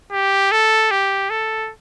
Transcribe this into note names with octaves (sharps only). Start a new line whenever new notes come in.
G4
A4
G4
A4